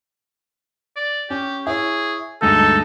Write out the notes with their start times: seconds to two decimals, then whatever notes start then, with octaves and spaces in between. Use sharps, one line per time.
0.96 D5
1.30 C#4 G4
1.67 E4 G#4 C#5
2.42 D2 G2 G#3 D#4 A4